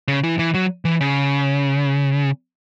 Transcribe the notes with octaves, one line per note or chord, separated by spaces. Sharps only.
C#3
E3
E3
F#3
E3
C#3